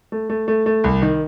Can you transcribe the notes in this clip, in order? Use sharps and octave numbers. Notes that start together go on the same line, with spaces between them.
A3
A3
A3
A3
C2
D#3